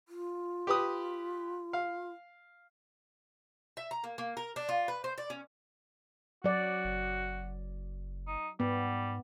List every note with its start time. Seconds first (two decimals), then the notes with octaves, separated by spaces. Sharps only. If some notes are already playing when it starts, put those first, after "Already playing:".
0.09 F4
0.67 G4 B4 D#6
1.73 F5
3.77 E5
3.91 A#5
4.04 A#3
4.18 A#3
4.37 A#4
4.56 D4
4.69 F4
4.88 B4
5.04 C5
5.18 D5
5.30 C#4
6.44 F#3 F#4 D5
6.84 F#1
8.27 D#4
8.60 G#2 G3 B3